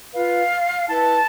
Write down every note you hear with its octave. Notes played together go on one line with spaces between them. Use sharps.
F4 B4 F5
E4 B4 A5